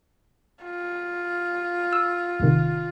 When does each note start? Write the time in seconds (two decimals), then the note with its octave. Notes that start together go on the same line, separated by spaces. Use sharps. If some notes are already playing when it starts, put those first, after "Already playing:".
0.63 F4
1.93 E6
2.39 A1 C3 D#3